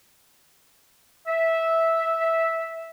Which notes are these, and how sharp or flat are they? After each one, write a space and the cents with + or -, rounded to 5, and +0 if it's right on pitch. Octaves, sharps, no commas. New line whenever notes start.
E5 -10